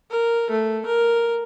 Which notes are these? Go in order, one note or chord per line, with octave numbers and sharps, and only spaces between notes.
A#4
A3
A#4